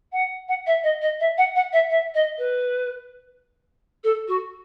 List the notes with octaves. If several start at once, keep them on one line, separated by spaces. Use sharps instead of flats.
F#5
F#5
E5
D#5
D#5
E5
F#5
F#5
E5
E5
D#5
B4
A4
F#4